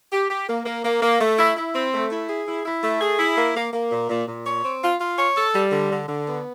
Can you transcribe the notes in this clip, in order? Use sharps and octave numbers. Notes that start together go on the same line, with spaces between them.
G4
G4
A#3
A#3
A#3
A#3
A3
E4
E4
C4
A3
E4
G#4
E4
E4
A3
G#4
E4
A#3
A#3
A#3
A#2
A#2
A#2
C#5
C4
F4
F4
C#5
A4
G3
D3
D3
D3
B3